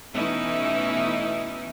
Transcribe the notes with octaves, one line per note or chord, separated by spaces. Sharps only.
B2 E3 A3 C#4 D#4 E4